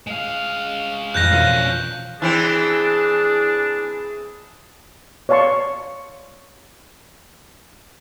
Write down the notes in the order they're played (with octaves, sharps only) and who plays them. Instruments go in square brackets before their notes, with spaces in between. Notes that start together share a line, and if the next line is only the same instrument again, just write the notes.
[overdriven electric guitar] G#3 F5
[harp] A1 F2 [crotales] F#6 G6 A#6
[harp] B2 F4 A#4 [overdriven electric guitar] C#4 D4
[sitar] E3 C4 [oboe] D4 [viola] G#4 A5
[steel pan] C#5 D5 F5 A5 C6 C#6